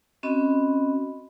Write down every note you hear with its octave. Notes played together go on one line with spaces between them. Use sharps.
C4 C#4 F#4 D#5 B5